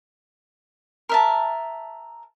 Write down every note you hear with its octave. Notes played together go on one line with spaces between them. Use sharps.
A#4 E5 A5